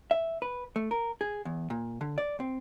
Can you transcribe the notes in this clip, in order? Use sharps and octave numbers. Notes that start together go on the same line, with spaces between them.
E5
B4
A3
A#4
G#4
E2
A#2
D3
D5
C4